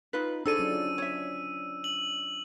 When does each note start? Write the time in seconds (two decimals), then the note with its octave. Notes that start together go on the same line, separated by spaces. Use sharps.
0.13 D#4 F4 B4
0.46 D4 D#4 G#4 A4 C5 D5 E6 D#7
0.59 F#3 C#4 F4
0.98 C#5 E5
1.84 F#7